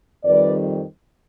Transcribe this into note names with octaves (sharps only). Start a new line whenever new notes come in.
F2 D#3 G3 B4 D5